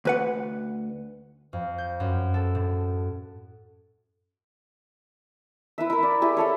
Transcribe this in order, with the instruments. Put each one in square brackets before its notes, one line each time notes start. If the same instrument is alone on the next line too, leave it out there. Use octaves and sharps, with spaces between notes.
[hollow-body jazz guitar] D2 B4 F#5
[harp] F2
G6
F#2
A4
A2
[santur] E4 B4 E5
E4 A#4
D5
E4 G4 G#4
E4 A4 C#5